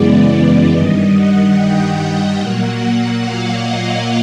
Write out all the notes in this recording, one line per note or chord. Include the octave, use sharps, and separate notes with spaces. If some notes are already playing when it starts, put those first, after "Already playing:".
Already playing: F#2 C#3 E3 G#3 B3 D5
G2 D#3 G3 D#5
F#5
G5
G5
A#2 F#3 A#3 F#5
F#5
F5
D#5